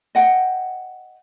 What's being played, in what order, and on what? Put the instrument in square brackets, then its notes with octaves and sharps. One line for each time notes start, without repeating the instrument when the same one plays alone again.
[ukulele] D#5 F#5 G5